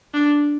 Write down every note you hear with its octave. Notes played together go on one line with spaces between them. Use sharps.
D4